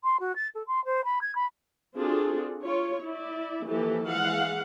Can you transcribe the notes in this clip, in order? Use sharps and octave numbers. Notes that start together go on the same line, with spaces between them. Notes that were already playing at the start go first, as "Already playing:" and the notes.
C6
F#4
A6
A4
C6
C5
B5
G#6
B5
C4 D4 F4 F#4 G#4 A4
F4 C#5
E4 D5
E3 F3 A#3 G4 A4
E3 G#3 F5 F#5